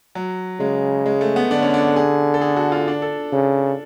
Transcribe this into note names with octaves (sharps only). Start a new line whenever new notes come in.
F#3
C#3 G#3
G#3
A3
B3
D3 D4
C#4
D4
G#4
A4
G#4
F#4
F4
D4
A4
C#3